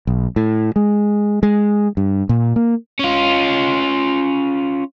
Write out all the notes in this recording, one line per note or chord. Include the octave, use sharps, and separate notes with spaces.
B1
A2
G#3
G#3
G2
A#2
A#3
C#4 F4